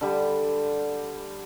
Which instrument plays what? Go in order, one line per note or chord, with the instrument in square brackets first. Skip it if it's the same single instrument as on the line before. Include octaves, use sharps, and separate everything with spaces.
[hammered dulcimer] D3 G3